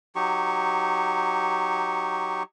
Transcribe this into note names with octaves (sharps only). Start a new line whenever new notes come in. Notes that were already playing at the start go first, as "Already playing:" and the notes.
F#3 D#4 G4 C#6